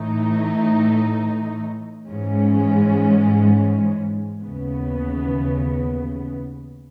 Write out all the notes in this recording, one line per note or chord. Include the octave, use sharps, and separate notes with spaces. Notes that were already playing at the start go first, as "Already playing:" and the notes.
Already playing: A2 E3 A3 D#4
G#2 E3 G#3 C#4
D#2 C#3 E3 B3